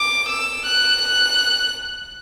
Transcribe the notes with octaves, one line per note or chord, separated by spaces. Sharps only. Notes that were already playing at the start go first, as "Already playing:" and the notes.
Already playing: D6
E6
F#6
F#6